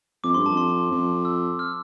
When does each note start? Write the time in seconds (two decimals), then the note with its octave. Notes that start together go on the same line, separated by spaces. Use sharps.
0.23 F2 D6
0.34 G2 C6
0.46 F2 A5
0.57 C6
0.91 F2
1.25 E6
1.59 F6